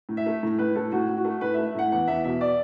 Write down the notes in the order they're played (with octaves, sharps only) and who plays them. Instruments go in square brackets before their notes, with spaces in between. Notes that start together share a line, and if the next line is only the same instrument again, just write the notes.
[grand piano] A2
E5
A3
A2
A2 B4
A2 A4
A2 F#4
A2
F#4
A3
A2 B4
E5
A3
E5
A2 F#5
E2 F#5
E2 E5
B2 E5
D5